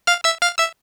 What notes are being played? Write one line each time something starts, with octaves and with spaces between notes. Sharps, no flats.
F5 F6
E5 E6
F5 F6
E5 E6